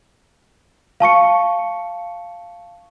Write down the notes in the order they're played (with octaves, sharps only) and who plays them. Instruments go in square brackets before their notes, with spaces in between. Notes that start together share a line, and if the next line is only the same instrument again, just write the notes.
[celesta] F5 A5 C#6 C#7